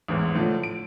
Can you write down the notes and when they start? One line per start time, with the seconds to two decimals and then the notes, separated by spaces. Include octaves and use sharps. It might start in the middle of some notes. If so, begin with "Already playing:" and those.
0.08 A1 E2 G#2
0.35 A2 D3 F3
0.63 D7